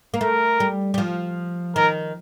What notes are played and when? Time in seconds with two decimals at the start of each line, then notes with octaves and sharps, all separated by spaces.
0.14 A#3
0.21 A3 A#4
0.60 G3
0.94 G3
0.98 F3
1.76 D#3 A#4